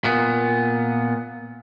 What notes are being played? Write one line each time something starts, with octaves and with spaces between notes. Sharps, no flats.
A#2 B3